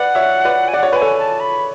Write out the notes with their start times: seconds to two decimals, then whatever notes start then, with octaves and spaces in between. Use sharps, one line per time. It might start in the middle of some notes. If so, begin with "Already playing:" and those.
Already playing: B4 D5 F#5
0.15 C#5 E5
0.45 B4 D5
0.68 G#5
0.74 D5 F#5
0.83 C#5
0.91 B4 F#5 G#5
1.02 A4 C#5
1.17 A5
1.39 B5